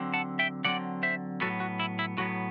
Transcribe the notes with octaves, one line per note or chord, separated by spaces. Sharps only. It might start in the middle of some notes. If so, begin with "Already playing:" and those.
Already playing: D3 F#3 C4
F#5 A5
E5 G5
D3 F#3 C4 D5 F#5
C5 E5
A2 F#3 B3 F#4 A4
F#4
E4
E4
A2 F#3 B3 F#4